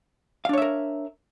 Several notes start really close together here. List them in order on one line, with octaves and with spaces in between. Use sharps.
F5 D4 C#5 E5 A#4